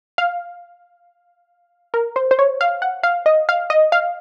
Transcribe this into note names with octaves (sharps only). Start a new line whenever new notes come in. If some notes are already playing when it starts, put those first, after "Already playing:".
F5
A#4
C5
C5
C#5
F5
F#5
F5
D#5
F5
D#5
F5